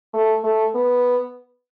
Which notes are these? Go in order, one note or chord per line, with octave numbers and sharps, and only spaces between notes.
A3
A3
B3